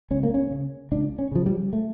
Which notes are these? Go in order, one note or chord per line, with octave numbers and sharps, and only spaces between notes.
C#2 C#4
A#3
C#4
C#3
C#2 D4
C#4
C#3 F3
G3
A3